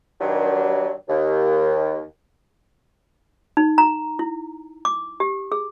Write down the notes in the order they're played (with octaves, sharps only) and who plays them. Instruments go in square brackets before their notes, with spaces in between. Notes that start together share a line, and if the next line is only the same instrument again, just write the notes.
[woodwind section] G2 D#3 F#3
D#2
[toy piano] D#4
A#5
E4
D6
G4
G#4